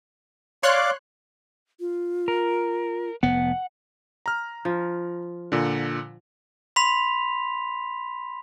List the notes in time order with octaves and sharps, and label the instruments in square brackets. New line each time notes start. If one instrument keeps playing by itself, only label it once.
[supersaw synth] C#5 C6 F#6 [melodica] D5 F5 D6
[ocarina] F4
[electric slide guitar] A#4
[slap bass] F1 B3 [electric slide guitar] F#5
[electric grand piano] A#5 F6
[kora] F3
[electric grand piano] A#2 D3
[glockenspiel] B5 C6 B6 F7